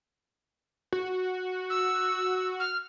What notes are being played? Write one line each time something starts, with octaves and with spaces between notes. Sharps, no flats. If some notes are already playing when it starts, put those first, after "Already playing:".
F#4
E6
F6